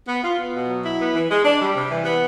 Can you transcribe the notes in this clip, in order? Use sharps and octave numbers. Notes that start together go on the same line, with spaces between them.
B3
F4
B3
B2
F#3
E4
B3
E3
G#3
D4
G3
C3
E3
B3